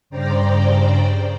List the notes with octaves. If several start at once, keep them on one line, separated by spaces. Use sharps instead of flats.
G2 C#3 C5 D5 G5 A#5